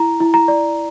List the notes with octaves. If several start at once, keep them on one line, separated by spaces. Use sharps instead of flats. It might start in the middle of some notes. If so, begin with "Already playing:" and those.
Already playing: E4 A#5
E4
A#5
D5